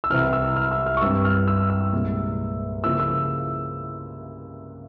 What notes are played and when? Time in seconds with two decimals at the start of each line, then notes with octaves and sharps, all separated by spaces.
0.04 E6
0.10 C2 C3 E3 F6
0.33 E6
0.56 F6
0.71 E6
0.86 F6
0.97 C#6
1.01 G2 G3 C4 E4 E6
1.25 F6
1.48 E6
1.70 E6
1.93 C2 A#2 G#3
2.84 C#3 F3 A#3 E4 E6
3.00 E6